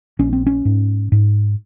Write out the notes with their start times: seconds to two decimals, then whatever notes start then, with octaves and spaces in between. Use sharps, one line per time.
0.19 A#1 C#4
0.33 C4
0.47 C#4
0.65 G#2
1.12 G#2